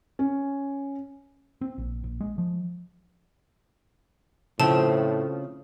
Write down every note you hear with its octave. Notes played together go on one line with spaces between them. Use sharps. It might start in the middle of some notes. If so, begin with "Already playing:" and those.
C#4
C4
A#1
A#1
G#3
F3
A2 C#3 F3 C4 A5